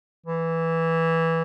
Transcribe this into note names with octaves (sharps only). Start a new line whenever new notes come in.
E3